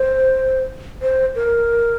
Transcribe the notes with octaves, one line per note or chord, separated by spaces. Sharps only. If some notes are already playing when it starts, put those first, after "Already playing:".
Already playing: C5
C5
A#4